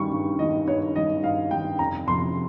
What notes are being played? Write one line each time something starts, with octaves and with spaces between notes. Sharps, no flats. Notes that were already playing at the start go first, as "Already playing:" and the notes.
Already playing: G2 D#3 G3 C#6
G2
D#3 G3 D#5
G2 C#5
D#3 G3 D#5
G2 F5
D#3 G3 G5
F1 A#5
F2 C3 C6